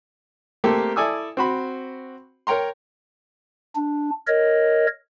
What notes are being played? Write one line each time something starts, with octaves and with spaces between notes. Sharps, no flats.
A3 A#3 C4 G4 A4 A#4
E4 A4 D5 G#5 D#6 E6
C4 F#4 B5
A#4 C#5 G5 A#5 C6
D4
A#4 C#5 D#5